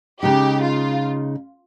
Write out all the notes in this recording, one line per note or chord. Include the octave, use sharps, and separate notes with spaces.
C#3 G#3 D#4 G4
F4